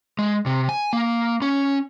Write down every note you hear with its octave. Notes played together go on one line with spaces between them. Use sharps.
G#3
C3
G#5
A#3
C#4